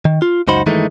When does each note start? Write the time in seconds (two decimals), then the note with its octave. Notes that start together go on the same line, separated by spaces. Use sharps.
0.05 D#3
0.22 F4
0.48 C#2 F#2 D#4 F#4 C5 B5
0.66 G2 D#3 E3 G#3 A3 D#4